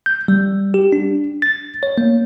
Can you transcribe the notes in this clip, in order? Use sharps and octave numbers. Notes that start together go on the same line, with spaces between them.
G6
G3
G4
D4
A6
C#5
A#3